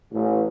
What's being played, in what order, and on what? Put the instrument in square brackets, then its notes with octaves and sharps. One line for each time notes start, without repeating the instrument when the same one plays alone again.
[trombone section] A1